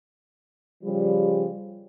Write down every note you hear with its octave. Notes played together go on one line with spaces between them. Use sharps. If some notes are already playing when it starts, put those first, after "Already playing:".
C#3 F3 G3